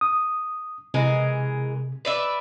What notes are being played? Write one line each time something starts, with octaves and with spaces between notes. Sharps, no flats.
D#6
C3 E3 G#3 A#4
B4 D5 E5